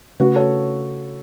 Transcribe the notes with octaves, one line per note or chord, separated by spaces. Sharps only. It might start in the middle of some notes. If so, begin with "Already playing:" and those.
C#3 A3 C#4 F#4 B4
A4 C#5